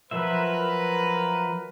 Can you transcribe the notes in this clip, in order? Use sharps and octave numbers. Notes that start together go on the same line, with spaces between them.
F3 F#3 A#4 B4 E5